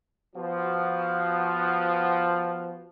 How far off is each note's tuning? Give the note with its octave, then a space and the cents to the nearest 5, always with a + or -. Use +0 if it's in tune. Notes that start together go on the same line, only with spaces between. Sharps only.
F3 +0 B3 +5 F#4 +10